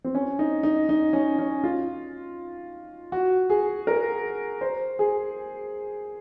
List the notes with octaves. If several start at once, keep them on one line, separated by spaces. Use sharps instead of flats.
C4
C#4
D#4
D#4
D#4
C#4
C#4
F4
F#4
G#4
A#4
C5
G#4